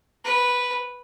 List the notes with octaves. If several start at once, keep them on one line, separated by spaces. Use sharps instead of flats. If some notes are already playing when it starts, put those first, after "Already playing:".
B4